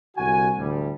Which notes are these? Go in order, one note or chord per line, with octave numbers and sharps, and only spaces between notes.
C2 D3 F#4 G#5
D2 A2 G3